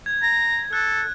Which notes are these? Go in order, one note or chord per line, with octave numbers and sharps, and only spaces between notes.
G#6
A#5
A4 F#6